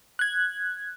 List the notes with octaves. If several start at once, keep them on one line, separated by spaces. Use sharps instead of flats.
F#6 G#6